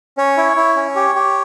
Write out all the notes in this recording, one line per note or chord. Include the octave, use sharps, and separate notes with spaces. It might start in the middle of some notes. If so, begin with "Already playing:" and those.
C#4 C#5
E4
E4
C#4
G4
G4